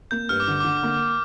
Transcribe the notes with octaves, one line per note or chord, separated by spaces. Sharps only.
A#3 G6
G2 F6
D6
D3
D3 D6
A#3